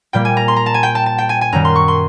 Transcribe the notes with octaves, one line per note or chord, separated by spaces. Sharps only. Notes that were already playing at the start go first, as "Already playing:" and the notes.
A#2 G3 A#3 G5
G#5
A#5
C6
A#5
A5
G#5
G5
A5
A5
G5
G#5
G#5
F#2 D#3 G3 A#5
C6
C#6
C6